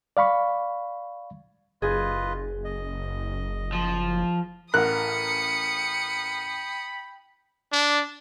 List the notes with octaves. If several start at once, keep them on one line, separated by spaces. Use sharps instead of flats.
D5 F5 B5 C#6
F#1 F4 G#4 B4 D#5
D#5
F3
A1 A#4 F#5 G5 B5 D#6 F#6 C#7
D4